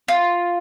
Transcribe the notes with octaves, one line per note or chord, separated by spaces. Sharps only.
F4